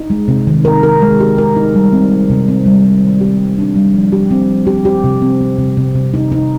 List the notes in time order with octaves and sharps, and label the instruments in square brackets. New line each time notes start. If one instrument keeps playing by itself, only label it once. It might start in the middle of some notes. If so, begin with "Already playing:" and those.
Already playing: [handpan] D#4
G#3
C3
D#3
A#4
A#4
G#3
G4
A#4
D#4
G3
C4
C4
C3
C4
G3
G3
D#3
G4
G3
D4
G3
F3
G4
C4
F3
G4
G4
C3
C4
C4
C3
C3
C3
D#4
D#4